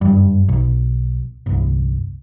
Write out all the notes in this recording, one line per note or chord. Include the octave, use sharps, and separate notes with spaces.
F#1 G2
B1
G1 C2